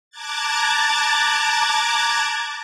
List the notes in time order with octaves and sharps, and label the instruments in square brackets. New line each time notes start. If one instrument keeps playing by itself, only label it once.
[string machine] A5 A#5 D6 F#6 G#6 A6